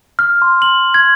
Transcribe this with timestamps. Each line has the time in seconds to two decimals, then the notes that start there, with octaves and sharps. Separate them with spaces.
0.19 F6
0.42 C6
0.62 F#7
0.94 G#6